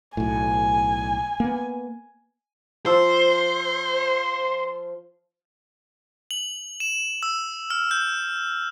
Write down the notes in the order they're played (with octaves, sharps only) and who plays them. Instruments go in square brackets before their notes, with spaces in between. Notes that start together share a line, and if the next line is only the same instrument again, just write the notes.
[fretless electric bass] B1 A2 [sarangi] G#5
[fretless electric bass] A#3 B3
[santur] F3 E6 [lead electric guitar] C5
[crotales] F#7
E7
E6
F6
G6